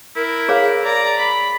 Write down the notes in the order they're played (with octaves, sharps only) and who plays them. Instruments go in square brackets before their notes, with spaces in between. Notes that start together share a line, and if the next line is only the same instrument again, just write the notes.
[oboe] E4 [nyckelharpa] A#4
[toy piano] G#4 C#5 F5
[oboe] D5 [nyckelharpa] A#5
[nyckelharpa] B5